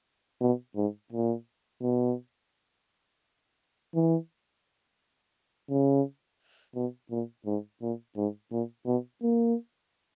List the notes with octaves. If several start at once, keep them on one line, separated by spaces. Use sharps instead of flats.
B2
G#2
A#2
B2
E3
C#3
B2
A#2
G#2
A#2
G#2
A#2
B2
A#3